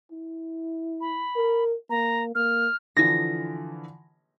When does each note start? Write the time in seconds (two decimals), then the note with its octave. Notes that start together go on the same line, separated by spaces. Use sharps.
0.12 E4
1.01 B5
1.36 A#4
1.90 A#3 A#5
2.35 A#3 F6
2.97 D3 E3 F3 A#6